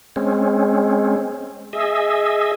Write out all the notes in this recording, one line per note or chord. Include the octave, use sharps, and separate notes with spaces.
G#3 C4 C#4
G#4 D#5 E5